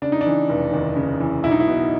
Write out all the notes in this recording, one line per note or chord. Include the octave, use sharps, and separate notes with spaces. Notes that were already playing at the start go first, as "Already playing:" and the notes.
C#3 D4
D#4
D4
E3
F1
D#2
C#3
E3
B1 E4
D#4
E4
B2